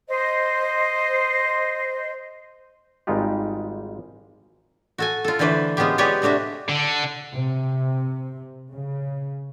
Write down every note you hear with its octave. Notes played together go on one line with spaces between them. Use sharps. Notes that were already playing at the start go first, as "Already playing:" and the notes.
C5 D#5
G#1 G3 G#3 D#4 F4 G4
F#4 A4 G#5
F4 A4
D3 E3 A3 B4 C5 D5
G#3 B3 C#4 F4 G4
G#3 B3 G4 B4 C#5 D5
C3 A3 D4 F#4 E5
D3
C3
C#3